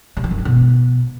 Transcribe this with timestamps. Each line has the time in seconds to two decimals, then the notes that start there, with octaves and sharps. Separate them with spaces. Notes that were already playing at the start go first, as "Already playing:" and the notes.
0.17 C3
0.24 F#3
0.31 F#2
0.38 C3
0.45 B2